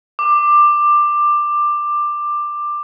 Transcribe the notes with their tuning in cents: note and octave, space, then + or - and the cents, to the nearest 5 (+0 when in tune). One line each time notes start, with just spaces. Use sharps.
D6 +15